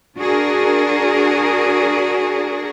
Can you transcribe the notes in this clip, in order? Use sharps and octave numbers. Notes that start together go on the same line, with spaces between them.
D4 F#4 G#4 A#4